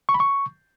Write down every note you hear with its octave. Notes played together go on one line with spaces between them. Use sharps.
C#6
B5
C#6